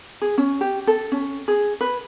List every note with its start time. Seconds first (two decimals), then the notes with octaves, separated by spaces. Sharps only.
0.22 G#4
0.38 C#4
0.61 G4
0.87 A4
1.12 C#4
1.48 G#4
1.81 B4